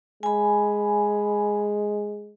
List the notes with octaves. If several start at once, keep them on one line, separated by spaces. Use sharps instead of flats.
G#3 G#5 B5